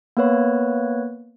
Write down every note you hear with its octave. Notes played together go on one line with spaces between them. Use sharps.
A#3 B3 B4 C#5